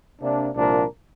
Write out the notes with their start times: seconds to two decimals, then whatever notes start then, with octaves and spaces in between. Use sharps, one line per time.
0.21 C3 A#3 D4
0.56 C2 A#2 F3 D4 A#4